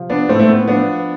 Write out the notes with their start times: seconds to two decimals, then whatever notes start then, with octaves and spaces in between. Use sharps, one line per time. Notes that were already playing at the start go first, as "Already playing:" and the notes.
Already playing: C3 F3
0.10 B3 D4
0.29 A2 A3 C4
0.39 A3
0.48 B3
0.68 F3 B3 D4